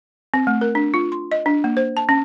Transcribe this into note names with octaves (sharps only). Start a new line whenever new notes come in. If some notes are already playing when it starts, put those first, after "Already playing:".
C4
A3
A#4
D4
F4
C6
D#5
D4
A#3
C5
A5
C#4